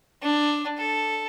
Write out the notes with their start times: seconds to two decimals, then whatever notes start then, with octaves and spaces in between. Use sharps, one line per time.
0.22 D4
0.78 A4